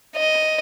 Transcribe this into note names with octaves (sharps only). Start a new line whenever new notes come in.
D#5